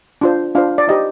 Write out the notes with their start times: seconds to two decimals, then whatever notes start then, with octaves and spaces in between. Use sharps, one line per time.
0.21 D4 F4 C5
0.55 D4 F4 C5 F5
0.78 D5
0.88 D#4 G4 C5 D#5